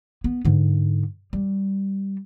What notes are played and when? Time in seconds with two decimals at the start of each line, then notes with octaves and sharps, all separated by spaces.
0.24 B3
0.45 G#2 D3
1.33 G3